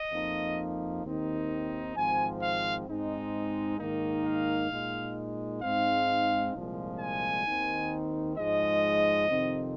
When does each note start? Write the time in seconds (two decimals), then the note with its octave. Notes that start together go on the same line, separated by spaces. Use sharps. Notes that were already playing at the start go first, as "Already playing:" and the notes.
Already playing: D#5
0.12 F2 F3 A#3 D#4
1.04 D#2 D#3 C4 D#4
1.96 G#1 G#2 F3 C4 G#5
2.42 F5
2.87 G#2 G#3 C4 D#4
3.79 G#2 D#3 A#3 D#4
4.26 F5
4.71 A#2 G#3 D#4
5.62 G#2 G#3 C4 D#4 F5
6.54 C2 A#2 F3 G#3
7.00 G#5
7.46 D#2 D#3 C4 D#4
8.37 G#2 F3 G#3 D#4 D#5
9.28 F2 C3 D#3 C4 D#4